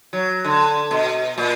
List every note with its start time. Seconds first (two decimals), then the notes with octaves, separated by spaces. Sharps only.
0.13 F#3
0.44 D3
0.91 B2
1.38 A#2